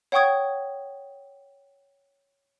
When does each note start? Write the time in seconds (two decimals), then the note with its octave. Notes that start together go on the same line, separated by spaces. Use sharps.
0.12 C#5 F#5 G5 C#6 D#6 G#6